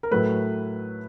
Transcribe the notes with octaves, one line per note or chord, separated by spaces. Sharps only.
A#4
A2 F#3 A3 B4